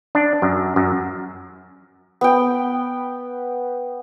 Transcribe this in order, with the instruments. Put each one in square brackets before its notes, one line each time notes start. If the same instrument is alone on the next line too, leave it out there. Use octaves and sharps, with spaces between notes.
[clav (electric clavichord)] D4
F#2
F#2
[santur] B3 G5